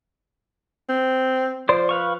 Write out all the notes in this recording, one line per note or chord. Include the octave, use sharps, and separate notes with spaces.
C4
F3 C5 D5
B4 F5 C#6